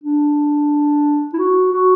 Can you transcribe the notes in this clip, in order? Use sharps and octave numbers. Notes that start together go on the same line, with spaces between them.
D4
E4
F#4
F#4